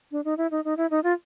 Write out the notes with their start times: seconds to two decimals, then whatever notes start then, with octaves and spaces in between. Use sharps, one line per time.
0.11 D4
0.25 D#4
0.38 E4
0.51 D#4
0.65 D#4
0.77 E4
0.91 D#4
1.04 F4